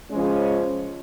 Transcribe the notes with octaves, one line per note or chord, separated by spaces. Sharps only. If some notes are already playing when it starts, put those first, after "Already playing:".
C#3 F3 G#3 C#4